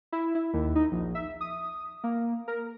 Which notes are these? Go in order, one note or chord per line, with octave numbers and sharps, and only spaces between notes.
E4
E4
D#2
D#4
A#1
E5
D#6
A#3
A#4